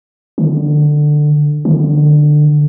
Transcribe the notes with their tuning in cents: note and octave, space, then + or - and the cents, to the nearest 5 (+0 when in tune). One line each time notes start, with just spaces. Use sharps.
D3 +15
D3 +20